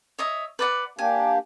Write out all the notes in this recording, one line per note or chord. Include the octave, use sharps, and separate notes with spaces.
C#5 D#5 E5
B4 D5 F#5
A#3 D4 G4 G#5